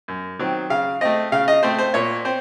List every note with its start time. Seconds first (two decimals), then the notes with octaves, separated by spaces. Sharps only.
0.08 F#2
0.39 D#3 F#3 C4
0.70 C#3 F5
1.01 A3 C4 D#5
1.32 C#3 F5
1.48 D#5
1.63 A3 C4 C5
1.79 C5
1.94 A#2 C#5
2.25 C4 C5